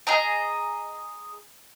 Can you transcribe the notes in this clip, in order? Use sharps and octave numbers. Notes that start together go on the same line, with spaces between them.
G#4 D#5 A#5